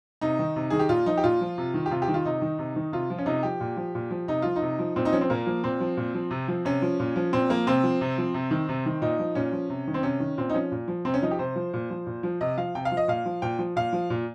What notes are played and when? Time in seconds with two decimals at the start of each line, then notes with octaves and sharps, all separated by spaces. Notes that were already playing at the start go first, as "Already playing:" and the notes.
0.21 C3 D#4
0.39 D#3
0.56 C3
0.70 D#3 G#4
0.79 G4
0.89 A#2 F4
1.06 F3 D#4
1.17 G4
1.24 A#2 F4
1.41 F3
1.58 C3
1.74 D#3
1.86 G4
1.91 C3 F4
2.02 G4
2.08 D#3
2.14 F4
2.25 C3 D#4
2.42 D#3
2.59 C3
2.76 D#3
2.92 C3 F4
3.10 F3
3.19 C#4
3.26 C3 D#4
3.43 F3 G4
3.60 A#2
3.77 F3
3.95 A#2
4.11 F3
4.28 C3 D#4
4.42 F3 F4
4.56 D#4
4.62 C3
4.79 F3
4.96 A#2 C4
5.05 D#4
5.13 F3 C#4
5.21 C4
5.30 A#2 A#3
5.46 F3
5.64 A#2 C4
5.80 F3
5.97 A#2
6.14 F3
6.31 C3
6.48 F3
6.65 C3 C#4
6.82 F3
7.00 A#2
7.16 F3
7.33 A#2 C4
7.50 F3 A#3
7.67 C3 C4
7.84 F3
8.01 C3
8.18 F3
8.34 C3
8.51 D#3
8.69 C3
8.86 D#3
9.02 A#2 D#4
9.19 F3
9.35 A#2 C#4
9.52 F3
9.70 C3
9.87 D#3
9.94 C4
10.03 C3 C#4
10.20 D#3
10.37 A#2 C4
10.49 D#4
10.54 F3 C#4
10.72 A#2
10.88 F3
11.05 C3 C4
11.14 C#4
11.22 F3 D#4
11.31 G4
11.39 C3 C5
11.56 F3
11.73 A#2
11.90 F3
12.07 A#2
12.23 F3
12.41 C3 D#5
12.57 F3 F5
12.75 C3 G5
12.85 F5
12.92 F3
12.97 D#5
13.08 A#2 F5
13.25 F3
13.42 A#2 G5
13.59 F3
13.76 A#2 F5
13.93 F3
14.10 A#2